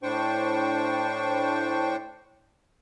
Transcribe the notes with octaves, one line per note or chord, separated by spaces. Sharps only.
A2 D4 C5 G5 C#6